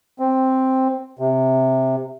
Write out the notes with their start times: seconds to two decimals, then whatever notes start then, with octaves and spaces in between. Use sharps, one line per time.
0.19 C4
1.19 C3